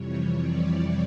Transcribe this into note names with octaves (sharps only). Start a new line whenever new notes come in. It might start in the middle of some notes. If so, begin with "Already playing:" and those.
Already playing: F2 C3 E3 G3 C#5
D5